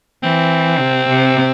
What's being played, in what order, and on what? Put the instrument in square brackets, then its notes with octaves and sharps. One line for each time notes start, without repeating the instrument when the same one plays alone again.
[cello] E3 [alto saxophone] C4
[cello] C3
C3